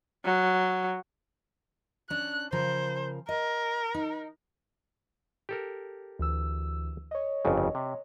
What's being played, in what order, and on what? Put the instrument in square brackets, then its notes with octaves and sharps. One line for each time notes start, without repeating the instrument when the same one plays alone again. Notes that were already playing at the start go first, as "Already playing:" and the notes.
[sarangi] F#3
[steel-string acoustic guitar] C#4 D4 [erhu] F#6
[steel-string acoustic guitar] C#3 F3 A#4 [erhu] C5
[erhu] A#4 [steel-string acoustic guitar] D#5
[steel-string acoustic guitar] D#4
[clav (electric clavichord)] G4 A4 A#4
[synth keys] D2 E3 E6
C#5 D#5
[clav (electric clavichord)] G1 F2 C#3
C3